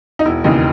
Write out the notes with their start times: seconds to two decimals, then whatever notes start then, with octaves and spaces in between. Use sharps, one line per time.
0.19 D#4
0.25 E1 E4
0.44 D#2 C#3 E3 D#4